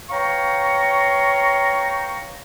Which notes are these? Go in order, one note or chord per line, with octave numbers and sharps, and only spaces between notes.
B4 C#5 F5 G5 A#5 C#6